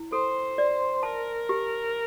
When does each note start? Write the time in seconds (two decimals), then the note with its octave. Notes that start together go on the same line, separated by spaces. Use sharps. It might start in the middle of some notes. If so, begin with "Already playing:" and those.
Already playing: E4
0.12 A4 C5
0.58 D5
1.03 A#4 A5
1.49 G4